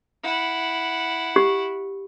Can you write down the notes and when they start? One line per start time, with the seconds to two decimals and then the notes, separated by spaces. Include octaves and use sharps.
0.23 E4 F#5
1.36 G4